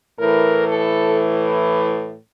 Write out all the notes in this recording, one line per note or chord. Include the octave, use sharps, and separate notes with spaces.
A2 E3 A#4
A4